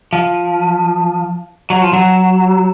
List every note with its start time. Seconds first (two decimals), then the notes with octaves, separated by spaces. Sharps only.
0.13 F3
1.70 F#3
1.82 F3
1.93 F#3